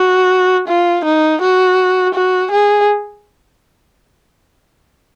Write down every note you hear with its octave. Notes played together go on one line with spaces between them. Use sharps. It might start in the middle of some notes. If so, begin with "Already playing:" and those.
Already playing: F#4
F4
D#4
F#4
F#4
G#4